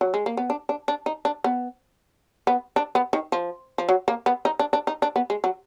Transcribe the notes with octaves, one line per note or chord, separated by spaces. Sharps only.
F#3
G#3
A#3
B3
D4
D4
D4
D#4
D4
B3
B3
D4
B3
D#3
F3
F3
F#3
A#3
B3
D#4
D4
D4
D#4
D4
B3
G#3
F#3